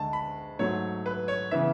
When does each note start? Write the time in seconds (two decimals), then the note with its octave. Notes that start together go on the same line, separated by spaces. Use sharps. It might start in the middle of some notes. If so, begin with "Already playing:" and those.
Already playing: D2 D3 G#3 A5
0.13 B5
0.59 G#2 F#3 A3 C#5
1.06 B4
1.28 C#5
1.51 C#3 E3 B3 E5